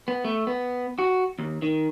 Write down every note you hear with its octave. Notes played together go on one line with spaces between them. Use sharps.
B3
A3
B3
F#4
D#2
D#3